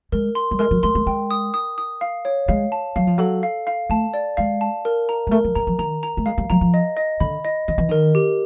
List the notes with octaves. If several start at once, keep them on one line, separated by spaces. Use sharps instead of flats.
G#3 A#4
C6
G3
G#3 A#4
F#3
G#3 C6
G#3
G#3 G5
D#6
D#6
D#6
F5
C#5
G#3 F5
A5
F#3 F5
F3
F#3 A4
F5
F5
A3 A5
D5
G#3 F5
A5
A#4
A#5
G#3
A3 A#4
F#3
G3 A#5
F3
D#3 A#5
A#5
A3
G#3 F5
G3
F#3 A#5
F3
D#5
D#5
D3 B5
D#5
D#3 D#5
E3
D#3 A#4
G4